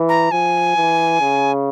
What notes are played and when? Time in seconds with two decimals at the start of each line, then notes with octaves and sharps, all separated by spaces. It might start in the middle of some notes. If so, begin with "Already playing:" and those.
Already playing: E3
0.09 A#5
0.31 F3 G#5
0.76 E3
1.20 C#3